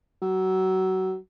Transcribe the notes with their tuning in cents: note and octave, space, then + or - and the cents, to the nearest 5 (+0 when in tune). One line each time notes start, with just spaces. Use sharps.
F#3 +25